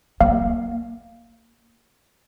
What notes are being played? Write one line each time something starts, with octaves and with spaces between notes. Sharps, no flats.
A#3 F5